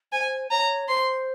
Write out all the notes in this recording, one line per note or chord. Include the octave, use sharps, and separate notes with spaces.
C5 G#5
C#5 A#5
C5 C6